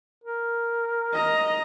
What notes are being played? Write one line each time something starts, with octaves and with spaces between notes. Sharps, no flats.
A#4
D#5 A#5